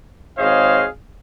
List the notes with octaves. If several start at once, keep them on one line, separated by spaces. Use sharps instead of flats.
G#1 G#4 C5 C#5 D#5 F5